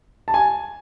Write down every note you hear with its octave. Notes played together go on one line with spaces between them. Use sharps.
A5
G#5